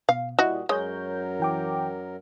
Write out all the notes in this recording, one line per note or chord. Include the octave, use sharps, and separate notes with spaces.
B2 F5
A#2 G3 E4 F#4 D#5
F#2 F#3 G#3 A#4 C#5 G6
E3 G5 D6